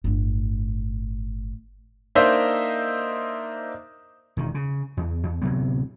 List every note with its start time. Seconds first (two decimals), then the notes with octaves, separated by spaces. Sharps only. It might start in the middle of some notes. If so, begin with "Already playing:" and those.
0.04 G1 A2
2.15 A#3 D4 D#4 C5 D#5 E5
4.37 E1 D#3
4.54 C#3
4.97 E2
5.23 E2
5.42 D1 C3 F#3 B3